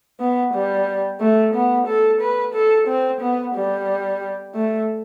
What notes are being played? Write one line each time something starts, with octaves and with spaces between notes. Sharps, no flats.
B3
G3
A3
B3
A4
B4
A4
C4
B3
G3
A3